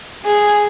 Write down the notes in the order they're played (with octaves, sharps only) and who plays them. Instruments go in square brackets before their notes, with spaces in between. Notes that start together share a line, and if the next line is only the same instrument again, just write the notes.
[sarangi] G#4